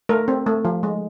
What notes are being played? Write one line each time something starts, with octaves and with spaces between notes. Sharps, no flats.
A3 A#4
C4
A3
F3
G#3